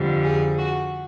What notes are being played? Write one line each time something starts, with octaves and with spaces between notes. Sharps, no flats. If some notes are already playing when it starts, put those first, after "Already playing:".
Already playing: F2 D3 G3
G#4
F#4